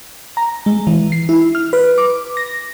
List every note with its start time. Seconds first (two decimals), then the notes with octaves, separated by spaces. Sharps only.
0.37 A#5
0.66 G#3
0.87 E3
1.12 C7
1.29 E4
1.55 F6
1.73 B4
1.98 D6
2.37 A#6